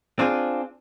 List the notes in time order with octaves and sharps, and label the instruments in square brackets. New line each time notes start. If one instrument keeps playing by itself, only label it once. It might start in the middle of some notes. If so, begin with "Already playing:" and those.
[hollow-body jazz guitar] C4 D4 F4 G#4